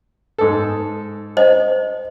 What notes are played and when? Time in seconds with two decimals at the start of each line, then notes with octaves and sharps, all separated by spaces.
0.38 G#2 A4
1.37 C5 D#5